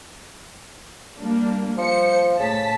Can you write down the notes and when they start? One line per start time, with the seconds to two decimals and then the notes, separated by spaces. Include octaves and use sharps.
1.20 G3 A#3 D4
1.78 F3 C5 C#7
2.39 A2 C#3 A5 B6